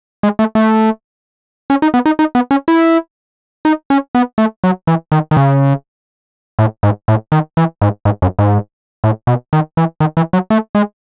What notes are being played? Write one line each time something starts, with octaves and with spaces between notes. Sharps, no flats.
G#3
A3
A3
C#4
D#4
B3
D#4
D#4
B3
C#4
E4
D#4
C#4
B3
A3
F#3
E3
D#3
D#3
C#3
A2
G#2
A2
D#3
E3
G#2
G#2
F#2
G#2
A2
B2
D#3
E3
D#3
E3
F#3
A3
G#3